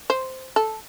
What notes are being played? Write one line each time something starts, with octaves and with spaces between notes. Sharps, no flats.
C5
A4